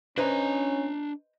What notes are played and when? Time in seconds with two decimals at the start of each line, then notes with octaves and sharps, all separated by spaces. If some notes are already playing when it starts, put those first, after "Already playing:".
0.18 C#4 D4 B4 C5 D#5 A#5